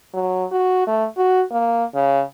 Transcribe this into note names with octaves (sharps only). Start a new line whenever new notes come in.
F#3
F#4
A3
F#4
A#3
C#3